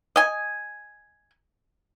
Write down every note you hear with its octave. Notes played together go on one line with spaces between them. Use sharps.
D#5 G#5